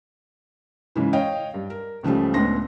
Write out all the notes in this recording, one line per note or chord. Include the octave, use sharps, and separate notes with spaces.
G#2 C#3 E3
C#5 D#5 F5 G5
G2
A#4
C#2 C#3 F3 G3 A3
C#2 A2 B3 D4 C6 A#6